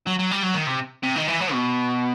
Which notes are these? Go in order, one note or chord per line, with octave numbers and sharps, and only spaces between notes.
F#3
F#3
G3
F#3
D#3
C3
C3
D#3
E3
F#3
B2